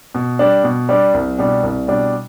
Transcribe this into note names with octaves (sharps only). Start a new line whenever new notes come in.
B2
G3 D4
B2
G3 D4
C2
B2 G3 D4
C2
B2 G3 D4